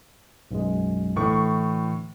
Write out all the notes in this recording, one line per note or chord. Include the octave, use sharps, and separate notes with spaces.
B1 F#2 G#3
A2 D3 E3 C#6